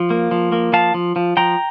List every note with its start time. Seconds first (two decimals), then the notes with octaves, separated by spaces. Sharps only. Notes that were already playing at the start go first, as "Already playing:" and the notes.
Already playing: F3
0.10 A#3
0.31 F3
0.52 A#3
0.73 F3 F5 A5
0.94 F3
1.16 F3
1.37 F3 G5 A#5